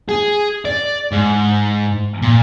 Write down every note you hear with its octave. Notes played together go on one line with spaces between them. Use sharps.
G#4
D5
G#2
A#2